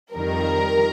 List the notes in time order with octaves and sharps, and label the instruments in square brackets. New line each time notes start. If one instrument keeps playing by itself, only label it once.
[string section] F2 D#3 G3 A#4